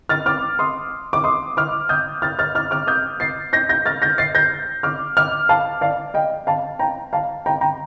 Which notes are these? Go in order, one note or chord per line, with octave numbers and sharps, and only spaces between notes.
F6 A6
D6 F6
C6 D#6
D6
C6 D#6
D6 F6
D#6 G6
F6 A6
F6 A6
D6 F6
D6 F6
D#6 G6
A6 C7
G6 A#6
G6 A#6
F6 A6
G6 A#6
A6 C7
G6 A#6
D6 F6
D6 F6
F5 A5
D5 F5
D#5 G5
F5 A5
G5 A#5
F5 A5
G5 A#5
G5 A#5